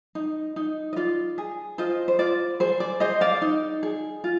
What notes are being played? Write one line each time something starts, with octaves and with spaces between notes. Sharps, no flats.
D#4
D#4
D#5
F4 D5
G#4
F4 C5 D#5
C5
F4 D5
G#4 C5
D5
G#4 C5 D#5
D5 F5
D#4
G#4
F4